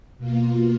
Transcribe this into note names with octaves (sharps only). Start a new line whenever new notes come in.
B2 A#3 F4